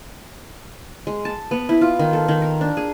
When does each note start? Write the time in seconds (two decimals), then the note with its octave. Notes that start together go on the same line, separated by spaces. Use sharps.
1.07 G#3
1.25 A5
1.51 B3
1.69 E4
1.81 F4
1.99 D#3
2.13 A4
2.28 D#3
2.42 A#4
2.61 D4
2.77 G#4